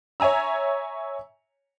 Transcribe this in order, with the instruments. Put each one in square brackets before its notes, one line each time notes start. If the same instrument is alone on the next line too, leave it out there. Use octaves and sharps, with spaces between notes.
[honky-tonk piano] C#5 E5 G#5 A#5 E6